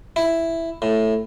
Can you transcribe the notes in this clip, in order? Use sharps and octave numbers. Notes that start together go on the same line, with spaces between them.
E4
A2